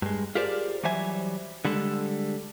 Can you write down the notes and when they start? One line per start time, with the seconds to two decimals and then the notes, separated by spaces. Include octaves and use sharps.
0.02 G2 G#3
0.35 F4 G4 G#4 A#4 C5 D5
0.83 E3 F#3 G3 C5 E5 G#5
1.65 D3 G3 G#3 A4